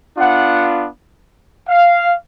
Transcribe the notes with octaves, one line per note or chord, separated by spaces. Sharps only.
B3 D4 F4 F#5
F5